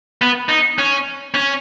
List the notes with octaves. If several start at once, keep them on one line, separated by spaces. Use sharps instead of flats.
B3
D#4
C#4
C#4